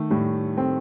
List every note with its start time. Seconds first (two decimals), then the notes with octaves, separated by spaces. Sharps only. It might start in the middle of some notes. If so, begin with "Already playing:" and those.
Already playing: D#3 A3
0.10 A2 G3
0.57 A3 C4